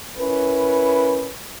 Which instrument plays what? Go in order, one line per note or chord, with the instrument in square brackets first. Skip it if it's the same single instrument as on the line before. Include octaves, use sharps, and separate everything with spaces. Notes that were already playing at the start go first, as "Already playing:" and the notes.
[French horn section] C#4 E4 A#4 B4